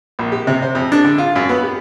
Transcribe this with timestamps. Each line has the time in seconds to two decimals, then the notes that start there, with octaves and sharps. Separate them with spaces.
0.19 A#1
0.32 G4
0.47 C3
0.62 C5
0.75 F2
0.92 D4
1.05 D3
1.18 F4
1.36 F#2
1.49 B3
1.63 G4